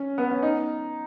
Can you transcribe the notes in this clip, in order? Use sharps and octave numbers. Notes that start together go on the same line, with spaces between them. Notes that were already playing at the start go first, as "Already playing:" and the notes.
Already playing: C#4
B3
C#4
D#4